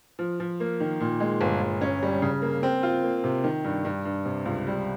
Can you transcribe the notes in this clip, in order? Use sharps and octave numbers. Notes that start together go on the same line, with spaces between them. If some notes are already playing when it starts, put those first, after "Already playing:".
F3
F3
A#3
D#3
A#2
G#3
G1
G1
C#4
G3
C#3
A#3
C4
F4
A#3
C3
D#3
G2
G2
G2
C3
C#2
G3